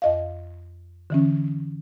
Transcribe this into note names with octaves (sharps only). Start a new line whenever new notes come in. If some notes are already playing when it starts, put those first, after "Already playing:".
F2 D#5 F5
D3 E3 C#4